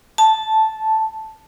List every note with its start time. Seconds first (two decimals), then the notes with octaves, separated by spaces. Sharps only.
0.18 A5